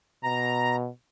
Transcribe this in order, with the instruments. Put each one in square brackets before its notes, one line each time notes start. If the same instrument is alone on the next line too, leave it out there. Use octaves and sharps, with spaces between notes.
[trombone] B2 [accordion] A#5